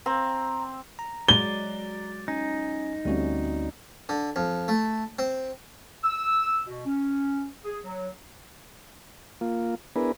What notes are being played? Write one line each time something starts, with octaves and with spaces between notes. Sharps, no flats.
C4 A#5
A#5
F#3 G#3 D5 G7
C#4 D#4 G#5
D2 G3 A3 C4 C#4 F#4
D3
F2
A3
C4
E6
B2
C#4
G#4
F#3
A#3 F4
B3 D4 E4 G#4 A#4 B4